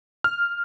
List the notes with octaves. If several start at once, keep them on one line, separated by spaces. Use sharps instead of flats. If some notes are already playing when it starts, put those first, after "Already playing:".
F6